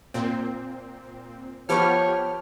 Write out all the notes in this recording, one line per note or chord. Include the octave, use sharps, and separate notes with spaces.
A#2 C4
F3 B3 G4 C#5 A5 B5 C#6 F6